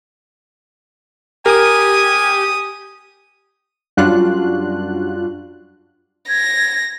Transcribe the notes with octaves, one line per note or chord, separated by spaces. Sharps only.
G4 A#4 G#5 D#6
F#2 G3 D4 F4 F#4 F#6
G#6 A#6